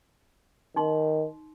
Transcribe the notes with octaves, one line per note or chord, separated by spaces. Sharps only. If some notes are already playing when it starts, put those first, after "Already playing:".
D#3 D#4 C6